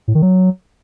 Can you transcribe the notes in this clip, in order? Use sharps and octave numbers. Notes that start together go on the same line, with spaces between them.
A2
D#3
F#3